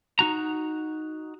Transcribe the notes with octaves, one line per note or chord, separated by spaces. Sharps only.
D#4 F#4 A#5